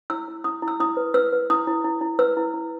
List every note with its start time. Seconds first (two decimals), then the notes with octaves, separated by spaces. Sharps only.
0.10 E4 E6
0.28 E4
0.44 E4 D#6
0.62 E4
0.68 E6
0.80 E4 D#6
0.97 B4
1.14 B4 E6
1.32 B4
1.50 E4 D#6
1.67 E4
1.84 E4
2.01 E4
2.19 B4 E6
2.37 E4
2.54 E4